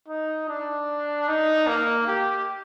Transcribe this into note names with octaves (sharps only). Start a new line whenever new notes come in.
D#4
D4
D#4
A#3
G4